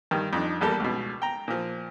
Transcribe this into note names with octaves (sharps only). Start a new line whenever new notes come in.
G2 D#3
F2 D4 D#4
A#1 E2 G3 G4 A4 A#4
C#2 B2
G5 A#5
A#2 F3